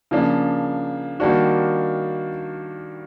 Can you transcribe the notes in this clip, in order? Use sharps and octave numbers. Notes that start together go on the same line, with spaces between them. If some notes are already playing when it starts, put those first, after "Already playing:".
C#3 F3 A#3 D4
D#3 G3 A#3 D4 F#4